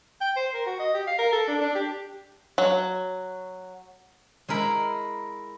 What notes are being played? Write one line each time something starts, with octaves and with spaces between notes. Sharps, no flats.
G5
C5
A#4
F#4
D#5
G4
F5
A#4
A4
D4
D4
G4
F#3
G#3 E4 A#4 B5